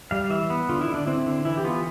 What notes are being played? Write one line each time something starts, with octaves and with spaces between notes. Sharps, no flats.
G3 F5
E3 E5
B3
D3 F4
E4
D3
D4
C4 E4
D3
E3 E4
G4
B3 F4